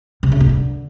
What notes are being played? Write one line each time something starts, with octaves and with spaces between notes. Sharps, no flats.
C3
C#3
B2
D3